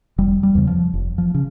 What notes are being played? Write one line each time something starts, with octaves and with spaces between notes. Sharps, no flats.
F1 G3
G3
E2 C#3
F3
F1
F3
C#3